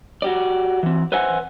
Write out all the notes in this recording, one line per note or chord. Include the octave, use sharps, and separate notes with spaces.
F#4 G4 D5
E3 C4
B4 C5 E5 F#5 G#5